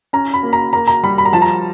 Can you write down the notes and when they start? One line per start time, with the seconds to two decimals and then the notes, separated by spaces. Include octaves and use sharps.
0.13 C#4 A#5
0.34 B5
0.43 A#3
0.53 A#5
0.73 A#3 A#5
0.87 A#5
1.03 G3 B5
1.18 B5
1.25 A#5
1.33 F3 A5
1.42 A#5